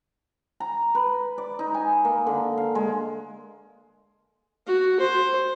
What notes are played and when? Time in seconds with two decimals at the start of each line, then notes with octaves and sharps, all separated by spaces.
0.60 A#5
0.95 B4
1.38 D5
1.59 D#4
1.74 G#5
2.05 A#3
2.27 D3
2.58 F5
2.75 G#3
4.67 F#4
5.00 C5